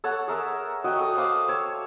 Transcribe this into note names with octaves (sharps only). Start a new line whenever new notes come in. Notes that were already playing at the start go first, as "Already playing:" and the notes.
A4 C#5 F#5
G#4 A#4 E5
F#4 D#5 G5
A4 D#6
C5 F5 D6
C#5 E6